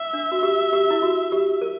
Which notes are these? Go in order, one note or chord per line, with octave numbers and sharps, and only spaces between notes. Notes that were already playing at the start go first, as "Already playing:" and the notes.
Already playing: E5
D4
F#4
G4
G4
E4
F#4
G4
A#4